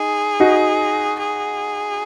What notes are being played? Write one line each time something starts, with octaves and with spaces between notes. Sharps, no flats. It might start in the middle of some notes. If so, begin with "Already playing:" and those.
Already playing: D#4 G#4
D#4 F#4
G#4